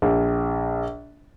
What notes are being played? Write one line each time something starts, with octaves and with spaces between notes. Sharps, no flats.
A#1